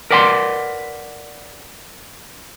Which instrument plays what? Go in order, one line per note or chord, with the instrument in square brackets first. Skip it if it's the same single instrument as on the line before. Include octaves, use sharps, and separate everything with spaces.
[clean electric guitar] A#4 B4 D5 F#5 G5 C6